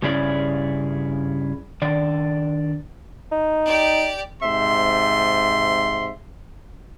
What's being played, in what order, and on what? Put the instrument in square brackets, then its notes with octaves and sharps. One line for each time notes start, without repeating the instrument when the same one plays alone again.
[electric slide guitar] G2 C#3 C#4 E4 G#4 D5
D#3 D4 D5
[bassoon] D#4
[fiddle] G4 D5
[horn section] G#2 C3 E5 C6